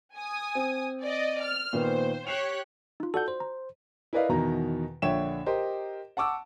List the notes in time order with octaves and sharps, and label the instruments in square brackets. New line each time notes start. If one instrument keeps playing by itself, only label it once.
[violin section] G#5 D#6
[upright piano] C4
[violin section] D5 D#5
F6
[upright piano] A#2 D#3 B3 [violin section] C5
[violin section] G4 C#5 F#6 [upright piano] C7 E7 F7
[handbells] D#4 F4
[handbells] F#4 D5 F#5 [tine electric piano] A4 G6
[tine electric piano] C5
[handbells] A#5
[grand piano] E4 A#4 B4 D5 D#5 F5
E2 B2 D#3 A#5
A#1 D3 C#5 E5 G5 E7
G4 A#4 C5 D#5
F#5 A5 C#6 D6 E6